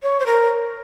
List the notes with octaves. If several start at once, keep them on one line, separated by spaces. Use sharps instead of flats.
C#5
C5
A#4